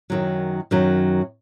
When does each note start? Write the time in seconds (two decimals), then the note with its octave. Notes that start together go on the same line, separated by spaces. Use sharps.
0.10 F#2 D#3 F#3
0.71 F#2 D#3 F#3